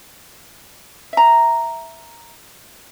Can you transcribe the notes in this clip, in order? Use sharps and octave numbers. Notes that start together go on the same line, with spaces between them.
E5 A#5